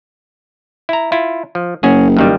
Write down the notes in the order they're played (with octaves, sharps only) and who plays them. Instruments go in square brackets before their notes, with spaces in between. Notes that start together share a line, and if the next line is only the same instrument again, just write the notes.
[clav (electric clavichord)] E4 A#5
E4 F4
F3
[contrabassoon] F#1 [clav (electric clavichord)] C#4 F#4 G#4
[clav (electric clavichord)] G2 D#3 G3